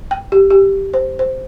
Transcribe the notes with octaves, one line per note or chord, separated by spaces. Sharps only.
G5
G4
G4
C5
C5